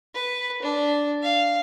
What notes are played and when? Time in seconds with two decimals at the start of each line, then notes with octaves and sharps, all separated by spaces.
0.14 B4
0.63 D4
1.23 F5